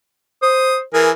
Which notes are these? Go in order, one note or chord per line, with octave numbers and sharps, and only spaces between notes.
C5 D#6
E3 G#4 A#4